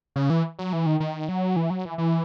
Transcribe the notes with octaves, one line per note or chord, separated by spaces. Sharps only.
C#3
E3
F#3
E3
D#3
D#3
F#3
E3
F#3
E3
E3